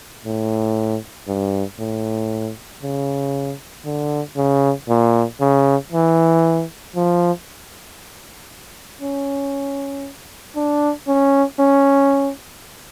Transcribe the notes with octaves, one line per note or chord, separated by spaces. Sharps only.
A2
G2
A2
C#3
D3
C#3
A#2
C#3
E3
F3
C#4
D4
C#4
C#4